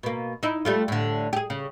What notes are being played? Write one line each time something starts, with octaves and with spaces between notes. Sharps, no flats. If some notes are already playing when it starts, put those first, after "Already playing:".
B2 A#3
D#4 E4
G3 A3 F4
A2 D3
G4 G#4
C#3